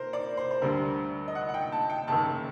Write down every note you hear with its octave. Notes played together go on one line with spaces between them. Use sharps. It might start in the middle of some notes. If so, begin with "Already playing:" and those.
Already playing: A#4 C5
D5
C5
C5
D2 D3 G3 A#4
D#5
F#5
F#5
G5
A5
G5
F#1 F#2 D#3 A5